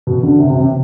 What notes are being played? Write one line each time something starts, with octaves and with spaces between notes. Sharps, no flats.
B2
D3
C3
C3
C3